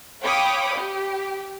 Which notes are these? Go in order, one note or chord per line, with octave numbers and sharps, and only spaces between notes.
C#5 F5 G5 B5 D6 D#6
G4